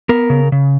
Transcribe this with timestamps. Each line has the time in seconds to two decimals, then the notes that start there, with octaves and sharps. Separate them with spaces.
0.09 B3 A#4
0.30 C#3
0.52 C#3